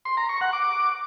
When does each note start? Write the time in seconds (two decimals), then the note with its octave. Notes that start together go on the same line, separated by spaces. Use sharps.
0.05 C6
0.17 A#5
0.29 C#6
0.41 F#5
0.53 D6